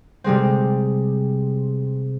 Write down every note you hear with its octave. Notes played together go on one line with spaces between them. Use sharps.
C3 G3 G#3 C4